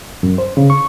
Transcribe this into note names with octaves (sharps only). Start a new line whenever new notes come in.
F#2
C5
C#3
C#6